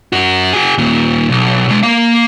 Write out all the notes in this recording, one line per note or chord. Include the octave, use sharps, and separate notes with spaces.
F#2 F#4
F#4 G#4
D#2 A#2
B1
B2 G#3
A#3 F5